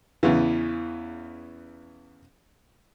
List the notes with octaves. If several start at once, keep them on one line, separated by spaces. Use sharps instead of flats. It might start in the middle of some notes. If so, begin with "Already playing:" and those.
E2 C#3 E3